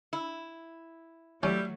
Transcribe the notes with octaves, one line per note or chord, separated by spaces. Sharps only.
E4
F#3 G3 A3 C#4 E4